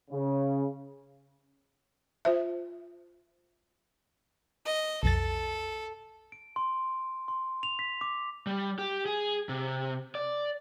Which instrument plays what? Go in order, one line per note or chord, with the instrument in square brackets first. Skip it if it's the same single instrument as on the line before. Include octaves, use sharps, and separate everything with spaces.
[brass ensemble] C#3
[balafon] F4 C5 E5
[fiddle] D#5
[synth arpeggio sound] B1 F2 A6 [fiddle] A4
[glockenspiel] D7
C6
C6
F7
B6
D6
[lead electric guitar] G3
G4
G#4
C3
D5